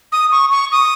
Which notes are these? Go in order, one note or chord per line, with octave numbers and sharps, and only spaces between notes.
D#6
C#6
C#6
D#6